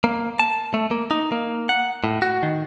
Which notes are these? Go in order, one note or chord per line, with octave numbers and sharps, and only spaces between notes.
A#3
A5
A3
A#3
D#4
A#3
F#5
A2
F#4
D#3